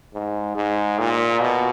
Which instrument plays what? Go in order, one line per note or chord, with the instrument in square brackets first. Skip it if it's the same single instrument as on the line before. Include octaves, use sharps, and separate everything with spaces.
[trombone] G#2
G#2
A#2
B2